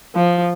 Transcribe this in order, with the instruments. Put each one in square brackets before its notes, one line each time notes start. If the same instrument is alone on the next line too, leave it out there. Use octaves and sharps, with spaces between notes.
[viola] F3